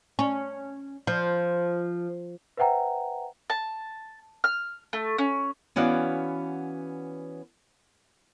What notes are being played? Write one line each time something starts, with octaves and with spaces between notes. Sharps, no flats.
C#4
F3
B4 C5 E5 F#5 G5 A#5
A5
F6
A3
C#4
E3 B3 C#4 F#4 D5 F5